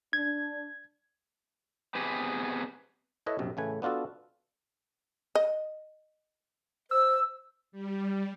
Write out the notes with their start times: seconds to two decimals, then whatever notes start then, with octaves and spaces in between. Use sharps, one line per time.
0.13 D4 G#6
1.95 B3 C4 G4 G#4 B4
3.26 E4 A4 B4 C#5 D#5
3.39 A#1 F#2 C3
3.57 A1 C#3 A3 B4 G#5
3.82 B3 D4 F4 F#4 A4
5.35 D#5
6.91 C5 E6
7.72 G3